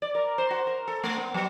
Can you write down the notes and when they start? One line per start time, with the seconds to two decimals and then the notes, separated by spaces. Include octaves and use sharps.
0.02 D5
0.15 A#4
0.38 C5
0.51 F#4
0.67 A#4
0.88 A4
1.04 A3
1.18 B3
1.34 F#3